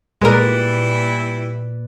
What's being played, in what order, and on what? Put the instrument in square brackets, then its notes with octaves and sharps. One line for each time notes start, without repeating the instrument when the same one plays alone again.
[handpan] A#2 B4 D5 [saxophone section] E3 G3 E4 [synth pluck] G#3 A#4